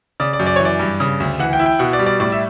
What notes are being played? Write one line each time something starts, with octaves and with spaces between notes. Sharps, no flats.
C#3 D5
D5
F#2
D5
E3 C#5
D5
G2
C#3
D2
E3 F#5
G5
E4
G5
B2 F#5
D5
G3
D5
A2 D5
E5